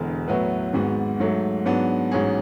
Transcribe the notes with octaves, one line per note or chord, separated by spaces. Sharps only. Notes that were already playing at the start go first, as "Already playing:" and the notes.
Already playing: E1 E2 D3 G#3
A2 F#3 B3 E4 B4
G#1 G#2 G#3 B3 F#4
G#2 F#3 A3
G#2 F#3 B3 D4
A1 G#2 F#3 C#4 G#4